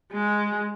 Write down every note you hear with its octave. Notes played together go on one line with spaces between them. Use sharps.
G#3